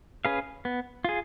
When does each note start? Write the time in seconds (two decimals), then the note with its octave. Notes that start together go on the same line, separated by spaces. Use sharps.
0.25 C#4 G#4 B4 F5
0.65 B3
1.05 F4 G#4